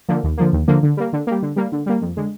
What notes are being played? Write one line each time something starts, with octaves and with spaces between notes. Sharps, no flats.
D3 F3 A#3
D#2
D3 F3 A#3
D#2
D3 F3 A#3
D3
G3 A#3
D3
G3 A#3
D3
G3 A#3
D3
G3 A#3
F2
D3 G#3